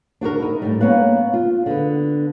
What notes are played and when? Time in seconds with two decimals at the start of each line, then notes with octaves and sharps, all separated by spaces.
0.21 D4 F#4 G4 A#4
0.40 D#4 E4
0.62 A2 G3
0.81 A#3 B3 C#4 C#5 F5 F#5
1.33 F4
1.66 D3 B3